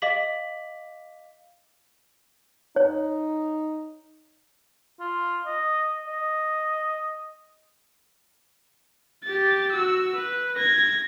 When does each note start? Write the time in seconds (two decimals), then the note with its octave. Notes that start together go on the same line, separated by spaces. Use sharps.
0.02 D#5 F5 D6 B6 F#7
2.76 D#4 C#5
5.00 F4
5.46 D#5
6.07 D#5
9.24 G4 A6
9.72 F#4 E6
10.15 B4
10.56 G#6 A#6